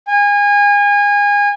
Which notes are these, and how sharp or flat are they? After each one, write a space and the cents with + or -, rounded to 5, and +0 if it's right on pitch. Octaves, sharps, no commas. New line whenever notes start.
G#5 -30